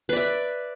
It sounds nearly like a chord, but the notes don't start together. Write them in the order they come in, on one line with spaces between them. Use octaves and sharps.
B4 D5 E5